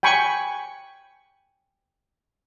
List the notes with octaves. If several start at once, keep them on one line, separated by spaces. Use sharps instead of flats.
G5 G#5 B5 C#6